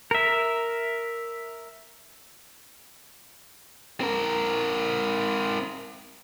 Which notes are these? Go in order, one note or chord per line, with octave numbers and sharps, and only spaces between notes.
A#4 E5
C4 A#4